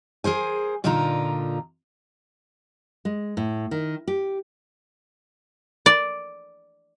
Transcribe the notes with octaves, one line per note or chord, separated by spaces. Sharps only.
G#4 A#4 C5 G#5
A#2 D3 D#4 F4 A#4 A#5
G#3
A2
D#3
G4
D5